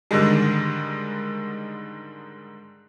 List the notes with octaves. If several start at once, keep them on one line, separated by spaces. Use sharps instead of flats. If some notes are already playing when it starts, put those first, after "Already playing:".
G#2 D3 D#3 G3 G#3